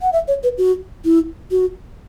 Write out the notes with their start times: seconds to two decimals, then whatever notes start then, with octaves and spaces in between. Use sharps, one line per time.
0.02 F#5
0.13 E5
0.28 C#5
0.43 B4
0.58 F#4
1.05 E4
1.51 F#4